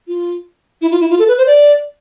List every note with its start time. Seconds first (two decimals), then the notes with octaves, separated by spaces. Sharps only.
0.07 F4
0.81 E4
0.91 F4
1.01 E4
1.10 F4
1.19 A4
1.28 B4
1.38 C5
1.47 D5